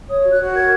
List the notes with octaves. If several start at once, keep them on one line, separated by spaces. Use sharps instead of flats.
C#5 D#6
F#4
F#6
F#4
A#4 G#6